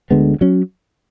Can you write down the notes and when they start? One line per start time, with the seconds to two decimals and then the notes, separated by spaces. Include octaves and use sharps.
0.11 D2 D3 G#3 B3
0.41 F#3 C#4